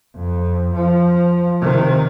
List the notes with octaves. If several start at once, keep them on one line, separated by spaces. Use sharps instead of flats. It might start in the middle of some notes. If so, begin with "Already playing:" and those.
F2
F3
C3 D#3